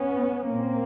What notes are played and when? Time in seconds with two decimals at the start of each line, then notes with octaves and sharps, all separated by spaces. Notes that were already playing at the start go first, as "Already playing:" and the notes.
Already playing: B3 C#4
0.48 A#2 A#3 C4